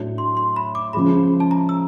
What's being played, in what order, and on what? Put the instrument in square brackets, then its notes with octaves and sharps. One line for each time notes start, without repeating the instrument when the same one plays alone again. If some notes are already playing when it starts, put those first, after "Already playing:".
Already playing: [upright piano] A2 F#3 A3 D4
[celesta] C6
C6
B5
D6
[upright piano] C#3 F3 G#3 [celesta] B5
[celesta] A5
A#5
E6